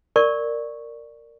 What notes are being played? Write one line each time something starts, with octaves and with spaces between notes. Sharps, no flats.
A#4 D5 C#6